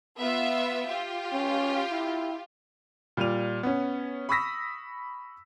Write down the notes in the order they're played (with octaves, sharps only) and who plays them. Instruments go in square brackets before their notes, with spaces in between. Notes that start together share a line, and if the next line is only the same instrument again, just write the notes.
[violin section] B3 F4 E5
F4 G4
[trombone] C#4
E4
[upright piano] A#2 G3 D5 D#7 F7
B3 C#4
B5 C#6 D#6 E6 A#6 B6